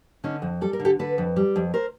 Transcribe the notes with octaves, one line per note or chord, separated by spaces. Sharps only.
D3 C#4 D#4
F2
G3 A4
A#4
D3
G4 A4
D3 A4 B4
F2
G3
F2
A#4 C5